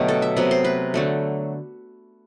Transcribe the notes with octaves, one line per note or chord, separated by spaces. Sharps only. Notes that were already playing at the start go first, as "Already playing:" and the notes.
Already playing: B2 D3 F#3 A3 G4
A4
E5
C3 F#3 B3
C5
B4
D3 F#3 A3